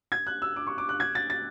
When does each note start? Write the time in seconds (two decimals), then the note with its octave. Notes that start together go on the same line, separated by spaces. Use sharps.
0.12 G#6
0.27 F#6
0.42 E6
0.56 D6
0.67 C#6
0.78 D6
0.89 F#6
1.00 G#6
1.15 A6
1.30 A6